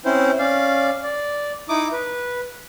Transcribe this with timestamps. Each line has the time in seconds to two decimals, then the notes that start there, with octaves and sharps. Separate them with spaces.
0.05 C4 C#4 E4 C5
0.39 C#4 D5 F5
1.04 D5
1.69 D#4 E4 D6 D#6
1.92 B4